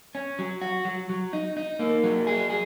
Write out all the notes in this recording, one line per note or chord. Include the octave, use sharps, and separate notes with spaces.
C#4
F#3
F#4
F#3
F#3
D#4
D#4
A#3
F#3
G#4
G#4